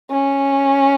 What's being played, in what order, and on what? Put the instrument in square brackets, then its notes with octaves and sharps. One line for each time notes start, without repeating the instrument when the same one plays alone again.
[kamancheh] C#4